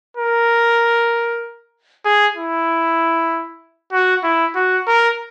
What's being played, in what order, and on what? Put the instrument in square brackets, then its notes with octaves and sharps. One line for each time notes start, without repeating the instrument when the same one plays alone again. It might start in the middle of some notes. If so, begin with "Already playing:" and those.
[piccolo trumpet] A#4
G#4
E4
F#4
E4
F#4
A#4